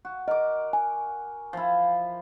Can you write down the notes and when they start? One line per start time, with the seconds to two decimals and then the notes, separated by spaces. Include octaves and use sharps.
0.05 F#4
0.28 A#4 D#5 D6
0.73 G#5
1.53 F3 E4